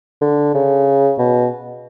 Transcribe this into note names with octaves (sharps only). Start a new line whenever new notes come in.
D3
C#3
B2